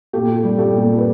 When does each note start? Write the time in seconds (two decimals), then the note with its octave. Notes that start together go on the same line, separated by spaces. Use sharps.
0.13 A#2 G4 A4
0.44 G3
0.58 G4 A4
0.73 A#2
0.98 B4